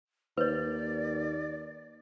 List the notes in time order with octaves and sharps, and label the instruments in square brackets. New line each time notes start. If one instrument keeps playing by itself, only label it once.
[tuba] D#2 [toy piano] B4 C#5 [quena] D5